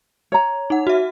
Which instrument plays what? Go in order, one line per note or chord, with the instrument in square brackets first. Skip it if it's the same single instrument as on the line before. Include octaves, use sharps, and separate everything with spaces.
[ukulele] C#5 A#5
[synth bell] D#4 F#5
F#4 E5